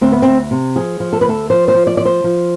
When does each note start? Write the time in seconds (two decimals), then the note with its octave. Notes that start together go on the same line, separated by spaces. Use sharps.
0.01 D2 C4
0.12 B3
0.22 D2 C4
0.51 C3
0.76 F3 G#4
1.00 F3
1.13 A4
1.21 B4
1.25 D2 A4
1.50 F3 C5
1.68 C5
1.74 F3
1.87 D5
1.97 F3 D5
2.05 C5
2.24 F3